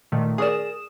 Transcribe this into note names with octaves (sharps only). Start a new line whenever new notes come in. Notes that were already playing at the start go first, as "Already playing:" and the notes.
A#2 D#3 A3
G#4 A#4 D5 D#6 E7